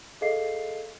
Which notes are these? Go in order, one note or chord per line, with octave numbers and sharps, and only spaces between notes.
G#4 A4 D#5 F5 C7